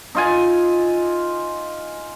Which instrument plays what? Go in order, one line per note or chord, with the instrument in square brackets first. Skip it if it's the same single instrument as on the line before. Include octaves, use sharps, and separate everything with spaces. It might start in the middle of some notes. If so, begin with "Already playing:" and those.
[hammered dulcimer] D#4 F4 G#5